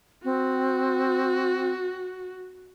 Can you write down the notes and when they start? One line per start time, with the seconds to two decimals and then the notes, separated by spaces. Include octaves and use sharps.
0.24 C4 F#4